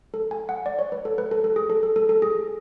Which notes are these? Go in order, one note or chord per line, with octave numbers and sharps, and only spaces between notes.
A4
G#5
F#5
D5
C#5
B4
A4
B4
A4
A4
G#4
A4
A4
A4
A4
G#4